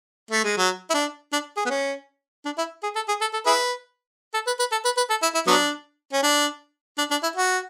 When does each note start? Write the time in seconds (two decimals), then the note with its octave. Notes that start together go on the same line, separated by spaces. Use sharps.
0.31 A3
0.44 G#3
0.57 F#3
0.90 E4
0.94 D4
1.33 D4
1.57 G#4
1.66 B3
1.70 C#4
2.45 D4
2.58 E4
2.83 G#4
2.96 A4
3.08 G#4
3.21 A4
3.33 A4
3.46 E4 G#4 B4
4.34 A4
4.47 B4
4.59 B4
4.72 A4
4.85 B4
4.97 B4
5.10 A4
5.22 E4
5.35 E4
5.47 F#3 B3 D4
6.13 C#4
6.23 D4
6.98 D4
7.11 D4
7.23 E4
7.36 F#4